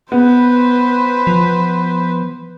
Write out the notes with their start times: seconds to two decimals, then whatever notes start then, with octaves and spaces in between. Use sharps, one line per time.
0.12 B3 B4 C5
1.27 F3